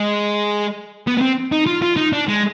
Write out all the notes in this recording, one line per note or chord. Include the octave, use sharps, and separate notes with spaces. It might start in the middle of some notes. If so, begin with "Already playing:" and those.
Already playing: G#3
B3
B3
C4
D#4
F4
F4
D#4
D4
G#3